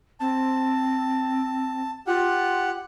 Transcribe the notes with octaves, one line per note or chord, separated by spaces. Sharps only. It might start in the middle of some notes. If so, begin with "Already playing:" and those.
C4 A5
F4 G4 F#5